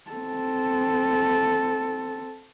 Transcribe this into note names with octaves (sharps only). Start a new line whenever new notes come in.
C4 A4